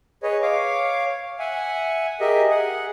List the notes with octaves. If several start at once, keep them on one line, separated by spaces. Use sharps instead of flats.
G#4 B4 C#5 D#5
C#5 F5 D6
E5 F#5 G#5
G4 G#4 A#4 D#5 E5
G#4 F#5